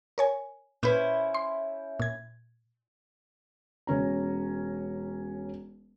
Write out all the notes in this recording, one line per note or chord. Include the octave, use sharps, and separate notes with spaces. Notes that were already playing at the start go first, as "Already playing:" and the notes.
A#4 C#5 G#5
A#2 C#4 E4 B4 C5
C6
A#2 G#6
E1 C#4 A#5